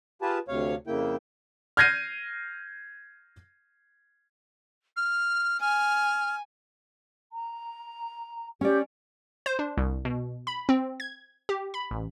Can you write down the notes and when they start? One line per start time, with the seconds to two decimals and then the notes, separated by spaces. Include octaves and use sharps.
0.22 F4 G4 G#4 B4 A5
0.48 D2 C3 C#5 F5
0.87 F2 C#3 A#3 E4 G5
1.77 F6 G6 G#6 A#6 C7 D#7
4.96 F6
5.61 G#5 F6
7.32 A#5
8.61 C#4 G4 D5
9.46 C5
9.59 D4
9.78 C2
10.05 B2
10.47 B5
10.69 C4
11.00 G#6
11.49 G4
11.74 B5
11.91 A1